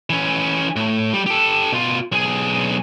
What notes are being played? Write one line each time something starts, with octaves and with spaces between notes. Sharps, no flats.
E3 C#4
A2
G3
G4 A4
B2 F4
B1 G#4